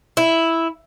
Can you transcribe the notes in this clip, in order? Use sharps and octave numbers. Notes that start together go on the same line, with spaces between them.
E4